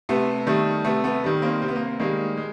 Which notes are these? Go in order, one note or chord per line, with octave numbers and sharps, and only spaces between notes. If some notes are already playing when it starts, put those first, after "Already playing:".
C3 A3 B3
D#3 G3 A3
C3 A3 B3
A3 B3
D#3 G3
A#3 C4
C3 C4
B3
A#3 C4
D#3 G3 G#3 A#3
G#3